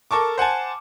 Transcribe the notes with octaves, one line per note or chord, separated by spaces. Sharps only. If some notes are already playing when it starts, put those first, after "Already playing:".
A4 A#4 A5 C#6 D6
C5 F#5 G#5 A5